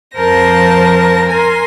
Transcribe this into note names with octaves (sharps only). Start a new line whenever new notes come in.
F2 F3 A#4 C5 A5 A#6
A#4 G#5 C6